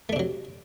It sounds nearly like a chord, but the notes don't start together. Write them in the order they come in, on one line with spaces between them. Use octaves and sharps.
A3 D4 C3 F#3